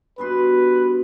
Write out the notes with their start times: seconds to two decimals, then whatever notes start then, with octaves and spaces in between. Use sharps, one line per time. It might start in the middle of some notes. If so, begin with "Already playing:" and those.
0.18 G2 B2 B4 C6